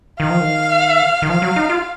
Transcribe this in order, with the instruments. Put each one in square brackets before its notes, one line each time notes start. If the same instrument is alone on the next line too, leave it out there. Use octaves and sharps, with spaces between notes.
[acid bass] D#3 [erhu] F5
[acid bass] F3
D#3
D#3
[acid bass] F3 [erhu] F5
[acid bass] F#3
D#4
F4